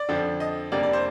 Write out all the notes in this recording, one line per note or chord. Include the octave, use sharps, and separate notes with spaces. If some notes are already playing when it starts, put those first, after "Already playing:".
Already playing: D5
F2 D3 F3
D#5
F2 C3 G3 A#3 D4 D5
D5
C5